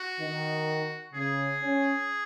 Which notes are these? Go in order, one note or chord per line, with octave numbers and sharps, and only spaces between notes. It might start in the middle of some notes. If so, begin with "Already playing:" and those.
Already playing: F#4
D#3
C#3 G#4
C#4